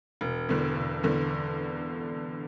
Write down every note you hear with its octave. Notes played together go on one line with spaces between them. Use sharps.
E1
E2 D3
E1
E2 D3